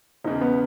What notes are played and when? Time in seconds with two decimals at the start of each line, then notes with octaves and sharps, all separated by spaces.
0.24 E1 E2 C#3 D#4
0.41 B3